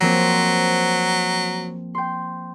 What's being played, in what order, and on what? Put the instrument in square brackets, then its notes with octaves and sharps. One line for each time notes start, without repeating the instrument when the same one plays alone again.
[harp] F3 A#3 C4 [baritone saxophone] F#3
[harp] G5 C6